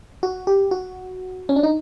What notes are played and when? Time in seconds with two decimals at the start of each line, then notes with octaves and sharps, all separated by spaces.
0.23 F#4
0.47 G4
0.71 F#4
1.49 C#4
1.56 D4
1.63 D#4